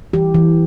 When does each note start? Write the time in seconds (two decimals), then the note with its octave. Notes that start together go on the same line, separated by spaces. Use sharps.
0.13 E3 G4
0.34 E3